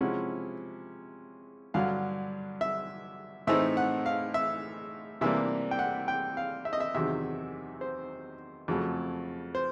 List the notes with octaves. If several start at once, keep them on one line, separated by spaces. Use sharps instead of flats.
C3 F3 G#3 C#4 E4 F#5
G2 D3 F#3 F5
E5
A2 E3 A3 C4 D#4 E5
F#5
F5
E5
C3 E3 G3 A#3 D4 E5
G5
F#5
G5
F5
E5
D#5
E5
E2 C3 D#3 F#3 E5
C5
F2 C#3 F#3 A3
C5